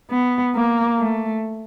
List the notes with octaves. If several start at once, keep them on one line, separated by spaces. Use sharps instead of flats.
B3
A#3
A3